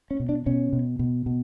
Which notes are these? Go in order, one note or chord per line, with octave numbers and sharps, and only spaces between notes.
C#4
B2
D4
B2 C#4
B2
B2
B2